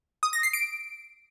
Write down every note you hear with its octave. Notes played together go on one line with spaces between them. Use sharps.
D#6
A#6
C7
D7